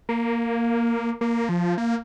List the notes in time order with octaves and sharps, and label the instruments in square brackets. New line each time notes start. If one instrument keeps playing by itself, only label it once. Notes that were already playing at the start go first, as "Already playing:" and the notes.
[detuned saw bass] A#3
A#3
F3
A#3